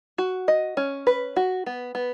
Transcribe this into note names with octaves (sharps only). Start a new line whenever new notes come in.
F#4
D#5
C#4
B4
F#4
B3
B3